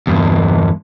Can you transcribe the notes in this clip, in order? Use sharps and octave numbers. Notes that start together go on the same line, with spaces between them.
E2 G2